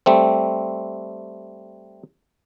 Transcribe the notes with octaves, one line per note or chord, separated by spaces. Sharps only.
G3 A3 C4